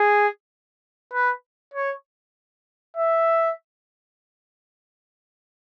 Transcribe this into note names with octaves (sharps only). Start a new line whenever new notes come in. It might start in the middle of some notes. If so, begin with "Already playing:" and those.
Already playing: G#4
B4
C#5
E5